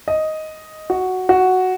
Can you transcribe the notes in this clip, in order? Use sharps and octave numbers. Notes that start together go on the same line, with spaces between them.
D#5
F#4
F#4